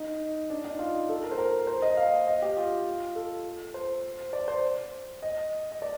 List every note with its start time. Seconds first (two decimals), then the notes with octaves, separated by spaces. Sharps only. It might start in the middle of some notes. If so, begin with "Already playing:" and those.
Already playing: D#4
0.50 D4
0.65 D#4
0.79 F4
1.09 A4
1.23 A#4
1.31 C5
1.38 A#4
1.67 C5
1.82 D#5
1.97 F5
2.27 D#5
2.42 G4
2.57 F4
3.15 A4
3.74 C5
4.33 D5
4.48 C5
5.22 D#5
5.72 D#5
5.82 D5